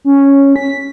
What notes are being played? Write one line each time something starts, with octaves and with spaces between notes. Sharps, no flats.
C#4
B6